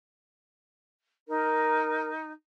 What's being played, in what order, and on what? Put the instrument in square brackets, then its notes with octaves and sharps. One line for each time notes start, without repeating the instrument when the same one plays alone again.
[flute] D#4 [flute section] A#4